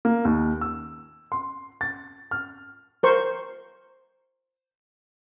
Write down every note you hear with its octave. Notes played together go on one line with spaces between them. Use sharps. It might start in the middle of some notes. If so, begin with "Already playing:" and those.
A#3
D#2
E6
C6
A6
F6
A#4 C5 C#6